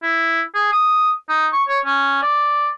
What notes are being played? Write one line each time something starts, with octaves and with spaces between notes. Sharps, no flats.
E4
G#4
D#6
D#4
C#6
C#5
C#4
D5